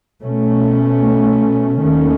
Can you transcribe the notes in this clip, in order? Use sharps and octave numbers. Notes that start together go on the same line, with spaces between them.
B2 A3 C#4
D#2 D#3 A3 C#4